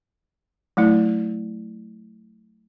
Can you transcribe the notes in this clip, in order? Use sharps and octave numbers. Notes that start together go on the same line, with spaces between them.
F#3 A3 E4